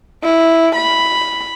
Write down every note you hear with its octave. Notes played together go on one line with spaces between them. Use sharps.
E4
B5